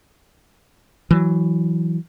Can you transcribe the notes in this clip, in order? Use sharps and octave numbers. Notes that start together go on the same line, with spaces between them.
E3 F#3